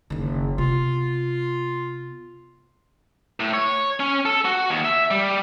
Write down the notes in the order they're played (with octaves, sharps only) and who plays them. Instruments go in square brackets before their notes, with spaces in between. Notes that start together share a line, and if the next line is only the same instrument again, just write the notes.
[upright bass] F#1 D#3
[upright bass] C3 B3 [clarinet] F4
[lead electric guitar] A2
C#5
C#4
A4
F#4
D#2
E5
G3